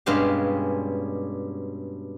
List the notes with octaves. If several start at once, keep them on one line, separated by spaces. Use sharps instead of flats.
G2 B2 G#3 C#4 G4 F5